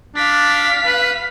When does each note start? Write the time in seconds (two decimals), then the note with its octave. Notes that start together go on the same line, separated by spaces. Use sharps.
0.16 D4 F5 B6
0.86 B4